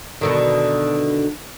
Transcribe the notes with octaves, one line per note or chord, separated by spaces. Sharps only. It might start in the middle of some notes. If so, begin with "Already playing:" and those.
B2 D3 D#3